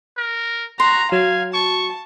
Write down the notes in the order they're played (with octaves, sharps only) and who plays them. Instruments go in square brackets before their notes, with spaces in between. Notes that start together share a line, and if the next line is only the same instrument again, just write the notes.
[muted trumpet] A#4
[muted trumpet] F#4 [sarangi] A#5 [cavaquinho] C6
[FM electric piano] F#3 [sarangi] F5 [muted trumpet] G#5
[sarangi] A5 [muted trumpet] C#6